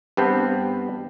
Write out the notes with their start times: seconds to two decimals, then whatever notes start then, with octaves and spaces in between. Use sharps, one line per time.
0.17 G2 B3 C4